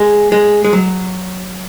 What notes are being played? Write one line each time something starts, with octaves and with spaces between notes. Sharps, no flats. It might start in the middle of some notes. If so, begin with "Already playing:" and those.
Already playing: G#3
G#3
G#3
F#3